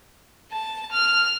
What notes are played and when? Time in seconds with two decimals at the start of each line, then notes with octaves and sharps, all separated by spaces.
0.52 A5
0.92 F6